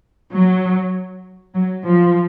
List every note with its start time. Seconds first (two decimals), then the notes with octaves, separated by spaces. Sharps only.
0.35 F#3
1.54 F#3
1.84 F3